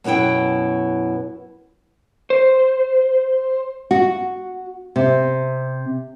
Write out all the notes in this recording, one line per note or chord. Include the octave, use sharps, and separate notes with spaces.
F#2 B2 B3 E4 G5
C5
F#4
C3